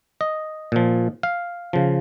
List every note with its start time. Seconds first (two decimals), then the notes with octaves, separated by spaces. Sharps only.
0.21 D#5
0.72 A#2 F3
1.23 F5
1.73 C#3 F3